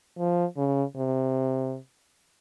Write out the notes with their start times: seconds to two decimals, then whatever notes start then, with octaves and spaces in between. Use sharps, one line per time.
0.18 F3
0.57 C#3
0.96 C3